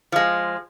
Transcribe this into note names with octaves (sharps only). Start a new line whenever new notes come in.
F3 G#3